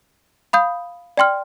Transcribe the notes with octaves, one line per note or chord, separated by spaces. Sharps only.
F5 B5 D#6 G6
D5 G5 C6 F6